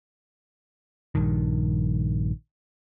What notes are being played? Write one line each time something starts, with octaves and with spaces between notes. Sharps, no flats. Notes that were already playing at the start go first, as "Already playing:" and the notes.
A#1 G2 D#3